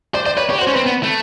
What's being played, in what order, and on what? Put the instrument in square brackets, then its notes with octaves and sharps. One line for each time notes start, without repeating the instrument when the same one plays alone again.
[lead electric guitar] C5 [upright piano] D5
[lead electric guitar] C5 [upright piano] D5
[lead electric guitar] B4 [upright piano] C#5
[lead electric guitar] G4 [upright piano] C#5
[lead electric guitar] F#4
[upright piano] C5
[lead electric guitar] C#4
[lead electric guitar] C4 [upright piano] B4
[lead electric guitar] B3
A3